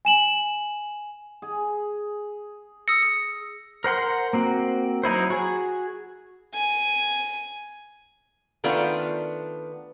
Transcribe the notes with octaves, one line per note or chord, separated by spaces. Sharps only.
G#5 E7 F#7
G#4
D#6 E6 A#6 C#7
D#6
A#4 C5 F#5 C6
A#3 C4 F#4
F#3 D#4 E4 C5
F#4 G#4
G#5
D#3 A3 B3 D4 F4